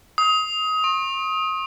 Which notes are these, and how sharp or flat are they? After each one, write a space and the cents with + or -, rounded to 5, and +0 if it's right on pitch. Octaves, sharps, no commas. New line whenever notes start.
D#6 +25
C#6 -45